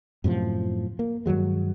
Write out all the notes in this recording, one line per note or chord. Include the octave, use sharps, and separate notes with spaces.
F#2 A2 C3 F3
A#3
G2 D#3 F#3 G#3